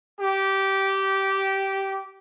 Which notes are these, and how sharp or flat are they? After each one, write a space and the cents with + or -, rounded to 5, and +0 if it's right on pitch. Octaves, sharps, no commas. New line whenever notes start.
G4 -15